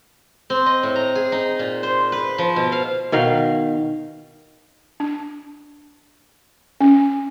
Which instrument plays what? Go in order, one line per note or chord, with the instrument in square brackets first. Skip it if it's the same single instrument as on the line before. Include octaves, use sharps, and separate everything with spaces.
[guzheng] C4
D#5
A2
A#5
G#4
D#4
A#2
C5
B4
F3
B2
F5
[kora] B2 D#3 F5
[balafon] D4
C#4